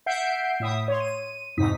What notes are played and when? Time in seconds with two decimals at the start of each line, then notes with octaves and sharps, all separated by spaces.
0.06 E5 F#5 G6 C7 D7
0.60 A2 E5 D#6
0.88 C#5 C6
1.00 D#7
1.57 F2 G#2 C3 D#4 D#6 B6